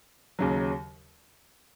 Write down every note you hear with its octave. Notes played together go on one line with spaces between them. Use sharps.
D#2 C#3 F#3